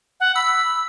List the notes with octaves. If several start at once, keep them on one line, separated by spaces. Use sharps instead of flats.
F#5
B5 E6